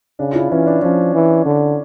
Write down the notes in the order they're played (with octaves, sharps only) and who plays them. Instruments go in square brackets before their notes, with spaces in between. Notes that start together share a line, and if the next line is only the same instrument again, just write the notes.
[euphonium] C#3 [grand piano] D4
[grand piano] F4
E4
[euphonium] E3 [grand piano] C#4
[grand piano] D4
[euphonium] F3 [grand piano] C#4
[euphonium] E3
D3